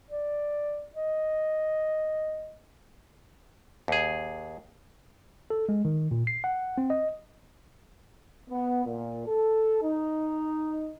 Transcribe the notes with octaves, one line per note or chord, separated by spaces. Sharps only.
D5
D#5
D#2 G#4
A4
G#3
D#3
A#2
C7
F#5
C4
D#5
B3
A#2
A4
D#4